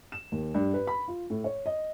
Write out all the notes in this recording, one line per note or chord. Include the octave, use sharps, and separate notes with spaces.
E7
D#2
G2
B4
B5
F4
A2
C#5
D#5